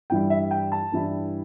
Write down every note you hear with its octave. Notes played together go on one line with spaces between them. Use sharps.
G2 E3 G3 E4 G5
E5
G5
A5
G2 E3 G3 E4